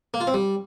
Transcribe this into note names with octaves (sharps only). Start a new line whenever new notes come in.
A#3
F4
C4
G3